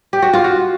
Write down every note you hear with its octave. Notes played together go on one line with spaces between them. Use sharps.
G4
F#4
F4
F#4